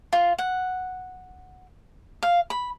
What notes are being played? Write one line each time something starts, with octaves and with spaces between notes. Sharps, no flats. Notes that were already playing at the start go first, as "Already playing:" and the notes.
F4
F#5
F5
B5